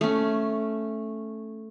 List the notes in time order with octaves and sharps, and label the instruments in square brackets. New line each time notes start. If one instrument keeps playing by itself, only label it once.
[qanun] A3 C#4